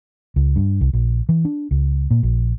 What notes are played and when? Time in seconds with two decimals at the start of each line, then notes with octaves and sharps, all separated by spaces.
0.36 C#2
0.56 G2
0.81 C2
0.93 A#1
1.29 E3
1.45 D4
1.71 C#2
2.11 A#2
2.23 A#1